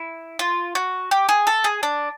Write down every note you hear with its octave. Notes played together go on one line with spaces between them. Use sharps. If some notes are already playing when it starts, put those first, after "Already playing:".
Already playing: E4
F4
F#4
G4
G#4
A4
G#4
D4